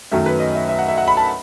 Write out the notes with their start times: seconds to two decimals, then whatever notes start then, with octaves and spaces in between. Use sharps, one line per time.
0.12 F#2 D#3 F#3 A3 C#4 E5
0.26 B4
0.40 D#5
0.55 E5
0.69 E5
0.79 F#5
0.88 E5
0.98 F#5
1.08 B5
1.17 A5